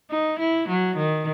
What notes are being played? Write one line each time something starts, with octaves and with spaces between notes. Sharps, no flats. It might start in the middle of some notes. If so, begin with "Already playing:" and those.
D#4
E4
F#3
D#3